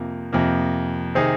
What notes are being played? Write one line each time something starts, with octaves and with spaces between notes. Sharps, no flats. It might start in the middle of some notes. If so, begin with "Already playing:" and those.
Already playing: F2 C3 F3 A#3
F2 C3 F3 A#3
C3 D#3 C4 D#4 G#4